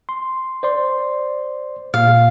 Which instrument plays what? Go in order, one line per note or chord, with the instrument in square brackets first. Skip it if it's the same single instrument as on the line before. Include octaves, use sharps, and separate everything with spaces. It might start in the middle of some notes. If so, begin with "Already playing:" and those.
[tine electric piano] C6
C5 D5 C6
[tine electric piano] A#2 [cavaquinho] F5